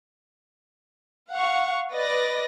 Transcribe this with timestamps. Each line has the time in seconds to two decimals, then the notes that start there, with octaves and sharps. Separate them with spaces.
1.30 F5 F#5 C#6
1.91 B4 D5 D#5 A6 A#6